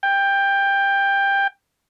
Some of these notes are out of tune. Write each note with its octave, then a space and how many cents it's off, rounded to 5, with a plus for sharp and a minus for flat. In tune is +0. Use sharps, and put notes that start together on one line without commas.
G5 +15